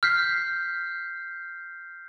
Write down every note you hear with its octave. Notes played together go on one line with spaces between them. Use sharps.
F6 G6 B6 C7